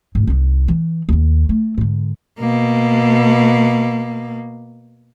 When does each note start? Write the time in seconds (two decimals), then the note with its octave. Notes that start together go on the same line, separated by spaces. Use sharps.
0.15 D2 G#2
0.27 C2 D#4
0.68 E3
1.09 D#2 D#3
1.49 A3
1.78 G#2 D3
2.40 B2 A#3